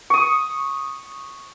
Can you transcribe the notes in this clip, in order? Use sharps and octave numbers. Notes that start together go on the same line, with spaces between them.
C#6 D#6